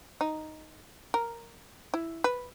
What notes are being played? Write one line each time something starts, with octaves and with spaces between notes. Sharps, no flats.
D#4
A#4
E4
B4